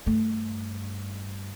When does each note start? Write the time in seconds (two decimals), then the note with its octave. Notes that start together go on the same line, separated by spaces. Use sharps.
0.06 G2 A3